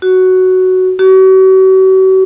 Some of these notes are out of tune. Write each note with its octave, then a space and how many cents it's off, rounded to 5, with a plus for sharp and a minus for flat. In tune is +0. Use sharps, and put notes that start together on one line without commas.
F#4 +5
F#4 +40